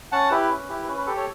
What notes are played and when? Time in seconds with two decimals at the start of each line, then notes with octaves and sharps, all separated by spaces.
0.12 C#4 F#5 A5
0.31 E4 G4 B4
0.49 C#4
0.69 E4 G4
0.87 C#4 B4
0.98 B4
1.06 G4 A4
1.17 A4 C#5